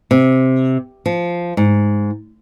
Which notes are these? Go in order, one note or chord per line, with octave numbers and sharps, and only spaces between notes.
C3
F3
G#2